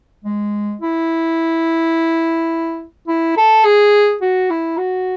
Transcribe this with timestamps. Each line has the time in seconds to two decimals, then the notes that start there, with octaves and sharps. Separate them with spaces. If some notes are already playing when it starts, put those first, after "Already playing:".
0.24 G#3
0.81 E4
3.08 E4
3.37 A4
3.65 G#4
4.21 F#4
4.50 E4
4.78 F#4